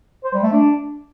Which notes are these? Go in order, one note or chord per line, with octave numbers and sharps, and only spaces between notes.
C5
G3
A3
D4